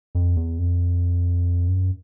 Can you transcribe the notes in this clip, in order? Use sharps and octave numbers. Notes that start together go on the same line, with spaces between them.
F2
E2
F2
F#2